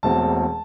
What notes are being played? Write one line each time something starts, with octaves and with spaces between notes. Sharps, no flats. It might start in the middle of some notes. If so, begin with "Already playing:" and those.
E1 E2 B2 A3 C4 A5